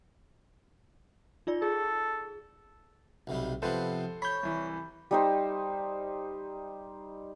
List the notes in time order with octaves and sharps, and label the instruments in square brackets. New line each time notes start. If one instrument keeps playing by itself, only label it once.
[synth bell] D#4 F4 D5
[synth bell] G#4 [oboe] A4
[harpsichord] B1 C3 G3
[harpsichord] C3 F3 B3 [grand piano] A4 B4 C5
[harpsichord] C#5 [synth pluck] B5 G6
[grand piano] C2 E3
[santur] G3 D#4 C5